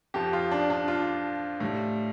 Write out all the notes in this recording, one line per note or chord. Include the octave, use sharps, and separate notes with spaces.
F2 F3 G4
F4
D4
D4
F4
A2 G3